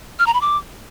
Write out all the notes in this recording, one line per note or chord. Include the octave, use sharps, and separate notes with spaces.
F6
A#5
B5
D6